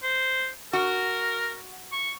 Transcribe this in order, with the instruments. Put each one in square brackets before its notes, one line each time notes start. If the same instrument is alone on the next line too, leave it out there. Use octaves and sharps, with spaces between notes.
[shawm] C5
[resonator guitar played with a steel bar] F#4 [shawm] A#4
[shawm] C#6